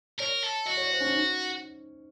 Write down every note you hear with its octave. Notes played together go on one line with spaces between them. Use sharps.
A#4 C#5
A4
F#4 D#5
C#5
C5
C#4
D#4